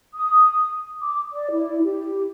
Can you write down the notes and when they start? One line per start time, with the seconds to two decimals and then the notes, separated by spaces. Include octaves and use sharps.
0.14 D#6
1.02 D6
1.33 D5
1.51 E4
1.83 G4